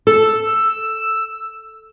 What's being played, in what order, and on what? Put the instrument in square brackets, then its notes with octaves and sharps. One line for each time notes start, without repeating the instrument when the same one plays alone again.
[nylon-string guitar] A4 [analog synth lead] E6